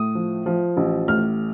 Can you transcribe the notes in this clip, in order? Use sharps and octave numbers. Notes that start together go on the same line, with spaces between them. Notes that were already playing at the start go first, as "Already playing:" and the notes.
Already playing: A2 D#6
F3
F3
A1
A2 F6